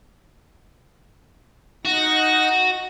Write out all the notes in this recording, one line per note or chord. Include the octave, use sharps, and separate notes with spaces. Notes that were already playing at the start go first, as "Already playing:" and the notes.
D#4 F#4 F#5 A#6